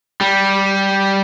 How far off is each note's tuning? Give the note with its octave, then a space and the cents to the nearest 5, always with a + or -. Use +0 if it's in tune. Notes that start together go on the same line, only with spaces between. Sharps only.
G3 -5